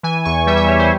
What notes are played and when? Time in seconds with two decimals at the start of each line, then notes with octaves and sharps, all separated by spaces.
0.03 E3 G#5
0.25 E2 C#6
0.47 G3 E5
0.57 E5
0.68 G3 C#5
0.79 C5